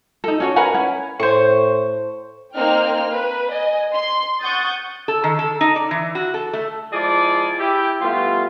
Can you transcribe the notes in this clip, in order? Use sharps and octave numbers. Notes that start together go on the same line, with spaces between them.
D#4 A4
C#4 F#4 C#5
A#4 B4 F#5 G#5
C#4 E4
A2 C5 C#6
A#3 C4 D#4 G5 F6
B4
D#5 G#5
C6
F#5 C#6 D#6 G6 A6
A4
D#3
A4
D#4
D5
E3
F#4
A4
A3
F3 G#3 E4 G#4 D5
E4 G4 G5
G3 A3 B3 F4